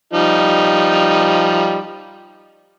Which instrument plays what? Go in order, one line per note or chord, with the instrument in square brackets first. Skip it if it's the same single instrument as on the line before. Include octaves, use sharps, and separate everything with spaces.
[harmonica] F3 G3 D#4